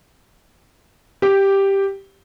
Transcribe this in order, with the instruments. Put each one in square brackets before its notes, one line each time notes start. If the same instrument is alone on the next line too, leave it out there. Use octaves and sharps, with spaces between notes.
[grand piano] G4